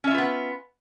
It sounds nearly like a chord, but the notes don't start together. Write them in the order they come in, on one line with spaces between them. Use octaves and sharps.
C#4 E5 F4 B4 B3